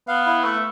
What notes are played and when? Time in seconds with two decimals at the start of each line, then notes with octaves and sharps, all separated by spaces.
0.08 B3 F5
0.26 E4
0.44 A3 B4